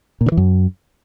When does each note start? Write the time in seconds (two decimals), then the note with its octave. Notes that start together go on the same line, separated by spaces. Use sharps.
0.21 A#2
0.26 D3
0.32 E3
0.37 F#2